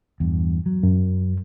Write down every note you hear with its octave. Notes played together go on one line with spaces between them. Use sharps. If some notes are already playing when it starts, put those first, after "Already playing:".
E2 G2
F#3
F#2